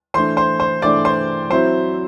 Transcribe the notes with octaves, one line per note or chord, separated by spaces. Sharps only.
E3 A3 D4 C5 C6
C5 C6
C5 C6
E3 A3 D4 D5 D6
C5 C6
F#3 C4 E4 C5 C6